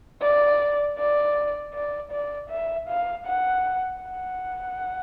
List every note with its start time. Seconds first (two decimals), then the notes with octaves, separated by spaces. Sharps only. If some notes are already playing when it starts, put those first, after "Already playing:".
0.22 D5
0.98 D5
1.74 D5
2.12 D5
2.50 E5
2.89 F5
3.27 F#5
4.03 F#5